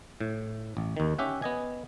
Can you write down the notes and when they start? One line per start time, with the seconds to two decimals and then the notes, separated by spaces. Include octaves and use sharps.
0.21 A2
0.77 A1
0.97 D#2 D#3
1.19 C#4 G4 E5 F#5
1.42 B3 D#5 G#5